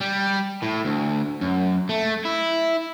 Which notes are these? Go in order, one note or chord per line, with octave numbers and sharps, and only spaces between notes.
G3
A2
D2
F#2
A3
E4